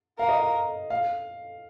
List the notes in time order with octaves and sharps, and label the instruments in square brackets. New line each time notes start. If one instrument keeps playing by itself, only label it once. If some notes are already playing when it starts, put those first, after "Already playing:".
[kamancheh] A#4 [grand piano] F5
[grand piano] D#5
F5
F5